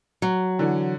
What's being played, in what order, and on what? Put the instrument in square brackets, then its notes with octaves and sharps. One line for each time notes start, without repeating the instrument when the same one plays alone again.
[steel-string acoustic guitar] F#3
[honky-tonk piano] D3 E3